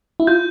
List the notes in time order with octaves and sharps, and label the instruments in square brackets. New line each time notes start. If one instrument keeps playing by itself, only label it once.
[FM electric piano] E4
[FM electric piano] F4 [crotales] G6